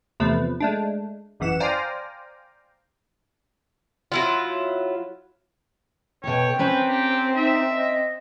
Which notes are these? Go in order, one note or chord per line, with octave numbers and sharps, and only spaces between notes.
E2 C3 F3 A3 B4
G#3 A3 D4
G#1 F#2 E3 F#5 E7
C5 D5 F5 G5 G#5 A#5
F#3 E4 F4
B2 A4 C#5 G5
C4 C#4 B4 C5 A#5
G4
D#4 E5
D#5